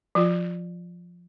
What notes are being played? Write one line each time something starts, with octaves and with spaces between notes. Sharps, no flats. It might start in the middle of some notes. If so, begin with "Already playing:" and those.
F3 F4